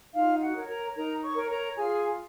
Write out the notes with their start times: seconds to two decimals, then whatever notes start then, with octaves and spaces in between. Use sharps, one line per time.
0.14 D#4 F4 F5
0.41 F#4 F#5
0.55 A#4 C#5
0.68 A#4 A#5
0.95 D#4 A#4 A#5
1.22 C#5 C#6
1.36 A#4 C#5
1.49 A#4 A#5
1.76 F4 G#4 G#5